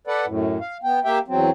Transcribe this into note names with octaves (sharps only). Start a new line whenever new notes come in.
A4 B4 D5 F#5
F#2 A2
F5
B3 G5
A#3 G4 E5 G5
E2 F#3 C4